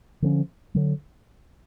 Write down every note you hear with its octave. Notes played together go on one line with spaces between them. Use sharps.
D3 F3 A3 C#4
D3 F#3